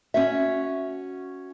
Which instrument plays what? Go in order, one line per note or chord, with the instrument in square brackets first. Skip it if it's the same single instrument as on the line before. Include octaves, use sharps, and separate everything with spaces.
[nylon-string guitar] C#4 F#4 E5